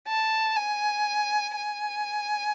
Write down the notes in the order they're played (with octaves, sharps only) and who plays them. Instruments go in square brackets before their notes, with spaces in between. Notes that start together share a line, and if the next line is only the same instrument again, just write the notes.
[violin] A5
G#5
G#5